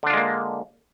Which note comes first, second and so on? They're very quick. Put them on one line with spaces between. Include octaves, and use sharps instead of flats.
D3 D4 F4 G#3 A#3